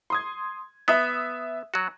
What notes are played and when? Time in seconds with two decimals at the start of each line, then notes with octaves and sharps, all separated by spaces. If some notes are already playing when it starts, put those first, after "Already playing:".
0.10 C6 D#6 G#6
0.88 B3 E5 D#6 E6
1.74 F#3 F#4